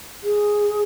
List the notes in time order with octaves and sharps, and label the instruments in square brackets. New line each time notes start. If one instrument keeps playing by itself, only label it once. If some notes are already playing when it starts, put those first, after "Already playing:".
[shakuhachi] G#4